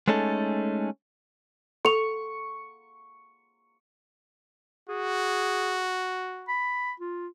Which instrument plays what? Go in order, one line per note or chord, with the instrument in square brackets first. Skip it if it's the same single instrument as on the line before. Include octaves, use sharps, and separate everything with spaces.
[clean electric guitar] G#3 A3 C#4 D#4 A4
[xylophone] A4 F7 [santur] C#6
[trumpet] F#4 [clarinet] G#4
[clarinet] B5
F4